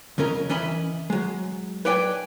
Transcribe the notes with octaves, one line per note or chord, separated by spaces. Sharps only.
F2 C#3 C#4 A#4 D#5
E3 C#4 D#5 E5 B5
F#3 G#3
B4 C#5 D5 E5 G5 G#5